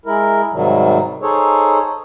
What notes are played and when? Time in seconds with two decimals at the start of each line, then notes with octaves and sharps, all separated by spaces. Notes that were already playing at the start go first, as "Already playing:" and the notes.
0.06 G#3 E4 A#4
0.53 G#2 C3 D#3 F#3 G3
1.22 D#4 G#4 A4 C5 C#5